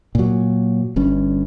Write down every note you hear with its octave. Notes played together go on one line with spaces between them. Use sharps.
A#2 F#3
G1 G2 C#4